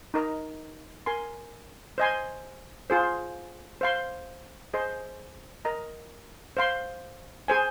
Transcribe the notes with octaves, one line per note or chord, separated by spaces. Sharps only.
D#4 A#4 D#5 A#5
A#4 G#5 C6
C5 D#5 G#5 C6
F4 G#4 C5
C5 F5 C6
G#4 C5 D#5 C6
A#4 D#5 A#5
C5 F5 C6
G#4 C5 G#5